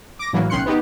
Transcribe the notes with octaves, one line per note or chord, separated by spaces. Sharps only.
D6 A#6
A2 E3 F#3 A#3
B1 D#3 C#4 C6 F#6 C#7
B3 D#4 G4